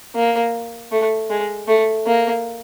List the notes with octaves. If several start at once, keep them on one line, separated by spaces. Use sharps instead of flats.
A#3
A3
G#3
A3
A#3